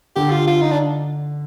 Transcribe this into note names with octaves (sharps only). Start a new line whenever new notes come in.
D3 G4
F4
F4
D#4
D4